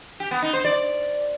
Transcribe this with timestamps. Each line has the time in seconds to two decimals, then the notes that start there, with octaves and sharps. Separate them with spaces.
0.20 G4
0.31 B3
0.42 D#4
0.53 C5
0.65 D5